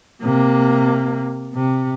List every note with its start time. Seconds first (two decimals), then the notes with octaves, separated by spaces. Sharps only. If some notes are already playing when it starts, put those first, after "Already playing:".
0.23 C3 A#3
1.55 C3